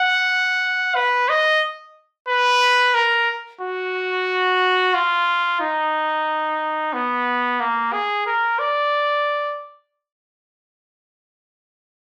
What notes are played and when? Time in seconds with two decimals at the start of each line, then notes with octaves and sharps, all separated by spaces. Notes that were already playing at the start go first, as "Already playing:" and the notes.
Already playing: F#5
0.95 B4
1.29 D#5
2.28 B4
2.95 A#4
3.61 F#4
4.94 F4
5.60 D#4
6.93 B3
7.60 A#3
7.93 G#4
8.26 A#4
8.59 D5